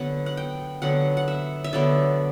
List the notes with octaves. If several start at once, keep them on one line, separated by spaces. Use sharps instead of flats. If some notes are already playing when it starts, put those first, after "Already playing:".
Already playing: D3 F#3 B3 F#5
F#5
G5
D3 F#3 B3 F#5
F#5
E5
E5
D3 F#3 B3 D5